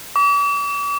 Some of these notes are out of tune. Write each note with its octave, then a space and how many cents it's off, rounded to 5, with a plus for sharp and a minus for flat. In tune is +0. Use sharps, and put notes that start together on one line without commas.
D6 -45